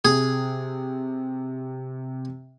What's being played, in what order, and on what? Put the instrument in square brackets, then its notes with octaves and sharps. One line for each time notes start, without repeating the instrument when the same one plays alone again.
[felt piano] C3 [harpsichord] G#4